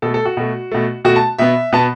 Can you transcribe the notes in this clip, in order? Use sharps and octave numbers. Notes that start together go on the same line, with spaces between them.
B2 A3 A4
A4
F#4
B2 A3
B2 A3
B2 A3 F#4
A5
B2 B3 E5
B2 B3 A5